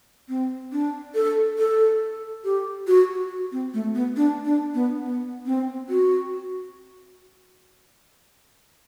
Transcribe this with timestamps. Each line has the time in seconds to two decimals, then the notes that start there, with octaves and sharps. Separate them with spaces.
0.29 C4
0.72 D4
1.15 A4
1.58 A4
2.45 G4
2.88 F#4
3.52 C4
3.74 A3
3.95 B3
4.16 D4
4.45 D4
4.74 B3
5.03 B3
5.46 C4
5.89 F#4